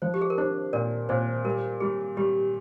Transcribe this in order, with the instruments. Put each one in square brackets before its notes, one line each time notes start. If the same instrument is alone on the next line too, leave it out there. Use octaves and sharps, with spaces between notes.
[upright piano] F3 [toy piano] C5
[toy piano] G4
G#4
A#4
[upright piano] D4 [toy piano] C5
[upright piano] A#2 [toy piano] A#4 D5
[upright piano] A#2 [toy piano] C5
[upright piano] G3 [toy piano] A#4
[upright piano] G3 [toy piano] G#4
[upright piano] G3 [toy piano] G4